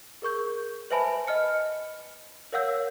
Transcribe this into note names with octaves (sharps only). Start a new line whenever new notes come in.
G#4 A#4 C#6 G6
B4 C5 E5 G#5 A5 B5
D#5 F6 C#7
A#4 C#5 F5 F#5 E6 G6